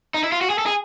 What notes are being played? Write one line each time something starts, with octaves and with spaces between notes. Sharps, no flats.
D#4
E4
F4
F#4
G#4
A4
G#4